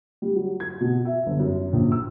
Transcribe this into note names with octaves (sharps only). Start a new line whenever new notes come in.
G3
F#3
G#6
B2
E5
G1
F#2
A#1
E6